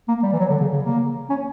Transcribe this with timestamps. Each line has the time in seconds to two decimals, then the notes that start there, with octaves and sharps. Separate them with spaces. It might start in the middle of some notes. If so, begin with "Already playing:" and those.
0.08 A#3
0.23 G3
0.33 E3
0.39 F#3
0.50 D3
0.61 C#3
0.72 C#3
0.84 A#3
1.30 C#4